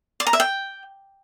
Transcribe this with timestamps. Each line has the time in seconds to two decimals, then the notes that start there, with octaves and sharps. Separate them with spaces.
0.20 D5
0.27 A#5
0.33 E5
0.40 G5